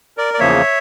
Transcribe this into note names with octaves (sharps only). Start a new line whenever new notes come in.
A#4 D5
D5
E2 C#3 F3 A#3 C#5 E5